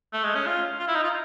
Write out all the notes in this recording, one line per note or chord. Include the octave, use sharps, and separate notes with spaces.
A3
G#3
C#4
F4
F4
E4
D#4
F4